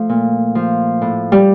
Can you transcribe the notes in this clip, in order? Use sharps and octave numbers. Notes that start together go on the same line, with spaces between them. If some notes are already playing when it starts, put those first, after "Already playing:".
Already playing: F3 A3
A#2
F3
A2
G3